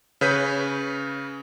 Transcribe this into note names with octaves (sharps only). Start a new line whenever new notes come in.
C#3 B4 C#5 G6 B6 D#7